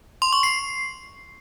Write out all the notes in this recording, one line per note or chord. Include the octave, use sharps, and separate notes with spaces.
C6
C#6
C7